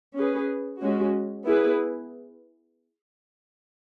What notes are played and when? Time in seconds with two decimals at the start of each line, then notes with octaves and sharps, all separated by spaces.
0.15 C#4 G#4 B4
0.80 G#3 C#4 F#4
1.45 B3 E4 G#4 B4